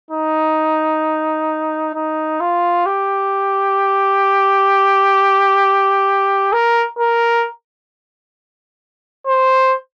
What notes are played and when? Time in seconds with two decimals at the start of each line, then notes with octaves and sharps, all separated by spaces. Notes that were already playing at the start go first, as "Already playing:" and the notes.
0.11 D#4
1.94 D#4
2.40 F4
2.86 G4
6.53 A#4
6.99 A#4
9.27 C5